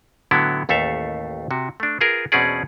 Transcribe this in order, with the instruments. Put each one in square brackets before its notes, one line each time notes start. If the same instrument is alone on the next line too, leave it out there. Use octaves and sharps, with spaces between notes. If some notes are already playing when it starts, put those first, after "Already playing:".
[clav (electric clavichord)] A2 D3 F#3 B3 E4
A1 D#2 A3 A4 E5 F5
C3 F#4
A3 D4
F4 G#4 A#4 B4
E2 B2 C4 C#4 G#4 D5